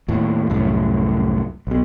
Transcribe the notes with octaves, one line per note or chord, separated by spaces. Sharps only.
D#2 A2
C2 F#2 A2
B1 B2